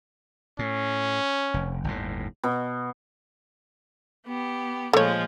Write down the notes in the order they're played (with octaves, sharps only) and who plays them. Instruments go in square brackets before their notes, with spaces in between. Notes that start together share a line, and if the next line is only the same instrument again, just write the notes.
[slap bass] A2 [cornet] C#4
[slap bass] F1
G1 D#2 A2
[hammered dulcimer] B2
[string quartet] B3 G4
[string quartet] A#2 F3 G#3 [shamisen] A3 C#5